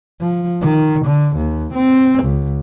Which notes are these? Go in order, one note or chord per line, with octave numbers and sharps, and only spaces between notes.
F3
D#3
D3
D#2
C4
C#2